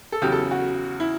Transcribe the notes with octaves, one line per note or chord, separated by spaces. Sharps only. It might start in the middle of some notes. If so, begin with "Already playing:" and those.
A4
E2 C#3 F#3 G4
A4
F#4
E4